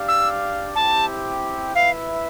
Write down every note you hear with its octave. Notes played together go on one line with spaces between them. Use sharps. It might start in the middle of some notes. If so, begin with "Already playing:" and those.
Already playing: D4 G4 D5 F5
E6
C4 E4 G4 A5
E4 B4 E5 F5